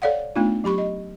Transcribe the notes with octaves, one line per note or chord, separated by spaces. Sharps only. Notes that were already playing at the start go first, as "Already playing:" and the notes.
A4 C#5 D5 F5 F#5
A3 B3 D4 D#4 F4
F#3 G4 B5 C#6
D#5